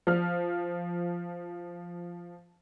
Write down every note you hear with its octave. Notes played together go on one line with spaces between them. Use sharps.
F3 F6